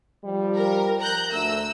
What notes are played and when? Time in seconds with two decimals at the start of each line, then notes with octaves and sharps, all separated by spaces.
0.23 F3 G3
0.55 A#4
1.00 A#5 F#6 G6
1.32 D2 A3 E6